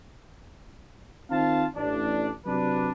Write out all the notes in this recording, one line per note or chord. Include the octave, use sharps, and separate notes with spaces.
D#3 C4 F4 F5 A5
A1 D4
C3 F#3 D4 B4 D5